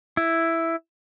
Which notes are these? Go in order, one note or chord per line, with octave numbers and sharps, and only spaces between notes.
E4